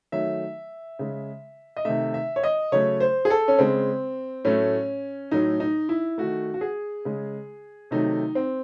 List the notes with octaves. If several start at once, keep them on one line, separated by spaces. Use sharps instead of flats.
D#3 F#3 A3 E5
C#3 G#3
D#5
C3 D#3 A3 E5
E5
C#5
D#5
C#3 F#3 A3 C#5
C5
G#4
A4
C#4
C#3 G#3 C4
A2 F#3 A3 C#4
A2 F#3 A3 D#4
D#4
E4
D#3 A3 F#4
F#4
G#4
C#3 G#3
C3 D#3 F#3 A3 D#4
C4